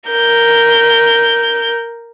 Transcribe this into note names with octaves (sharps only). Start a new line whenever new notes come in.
A#4 G6